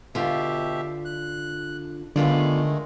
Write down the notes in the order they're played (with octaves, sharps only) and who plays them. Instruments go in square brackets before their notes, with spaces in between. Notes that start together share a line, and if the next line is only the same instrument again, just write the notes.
[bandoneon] B2 G4 E5 [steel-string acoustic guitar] D3 F4
[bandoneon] F#6
[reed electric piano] D3 [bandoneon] D#3 G#3 A3 [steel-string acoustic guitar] B3 F4 D5